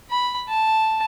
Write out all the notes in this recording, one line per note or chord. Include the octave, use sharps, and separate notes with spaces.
B5
A5